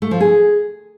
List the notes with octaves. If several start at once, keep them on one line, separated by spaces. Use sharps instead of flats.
A3
F3
G#4